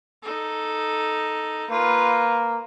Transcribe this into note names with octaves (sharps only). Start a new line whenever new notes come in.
D#4 A4
A#3 F4 B4